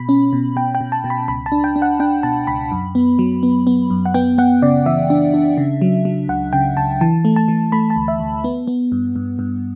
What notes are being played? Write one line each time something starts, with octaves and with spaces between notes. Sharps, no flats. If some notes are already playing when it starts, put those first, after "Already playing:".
Already playing: B2 B5
C#4
B2
B2 G5
G5
B2
A5
B2
B5
C#2 B5
A5
D4
G5
D4
F#5
D4 G5
B2 A5
C#2 B5
F#2
B3
F#3
B3
B3
F#2
F#5
B3 G5
B3 F#5
C#3 D5
E3 E5
D4
D4
C#3
F#3
F#3
C#2 F#5
C#3 G5
C#2 A5
E3 A5
A3
A5
E3
A3 B5
A5
D2
E5
D2
B3
B3
G2
G2
G2